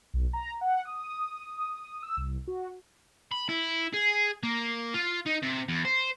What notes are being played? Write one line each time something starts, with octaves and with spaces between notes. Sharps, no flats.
B1
A#5
F#5
D#6
E6
C2
F#4
B5
E4
G#4
A#3
F4
D#4
C3
E2
C5